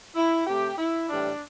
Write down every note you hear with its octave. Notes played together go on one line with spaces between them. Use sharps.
E4
C3 A3 G4
E4
A2 E3 G3 D4